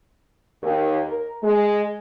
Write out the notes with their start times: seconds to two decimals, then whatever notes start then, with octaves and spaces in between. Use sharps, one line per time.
0.63 D#2
1.06 A#4
1.43 G#3